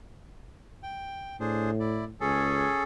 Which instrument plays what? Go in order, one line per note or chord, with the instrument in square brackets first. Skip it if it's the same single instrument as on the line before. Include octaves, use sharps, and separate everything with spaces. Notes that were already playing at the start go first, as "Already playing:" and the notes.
[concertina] G5
[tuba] A2 [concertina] D4 G#4 C5
[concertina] E4 D5
[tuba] C#2 [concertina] C#4 G#4 A4